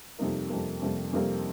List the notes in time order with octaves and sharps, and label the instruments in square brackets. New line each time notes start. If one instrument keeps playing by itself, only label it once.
[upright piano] F2 C3 G3 A#3 D#4
F2 C3 G3 A#3
F2 C3 G3 A#3
F2 C3 G3 A#3